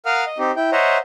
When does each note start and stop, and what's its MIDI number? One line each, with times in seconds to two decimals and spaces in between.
0.06 0.24 70
0.06 0.24 77
0.06 0.24 78
0.06 0.24 87
0.06 0.24 89
0.27 0.38 75
0.38 0.51 60
0.38 0.51 63
0.38 0.51 67
0.56 0.70 64
0.56 0.70 79
0.72 0.98 72
0.72 0.98 73
0.72 0.98 75
0.72 0.98 76
0.72 0.98 78
0.72 0.98 82